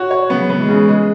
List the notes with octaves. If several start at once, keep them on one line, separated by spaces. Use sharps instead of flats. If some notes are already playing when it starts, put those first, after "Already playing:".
Already playing: F#4 C#5
C#5
C#3 F#3 B3
B3
E3 G#3
C#3
G#3